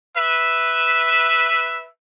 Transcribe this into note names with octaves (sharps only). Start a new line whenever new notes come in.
B4 E5